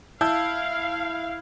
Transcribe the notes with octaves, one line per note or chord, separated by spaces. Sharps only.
E4 F5 A5 E6 G6